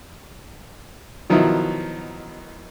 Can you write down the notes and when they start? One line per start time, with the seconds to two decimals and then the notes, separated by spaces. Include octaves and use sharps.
1.30 B2 D#3 F3 F#3 E4